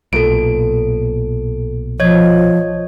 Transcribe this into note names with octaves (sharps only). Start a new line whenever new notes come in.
B1 A#2 A4 D7
F3 C#5 D#5 G#6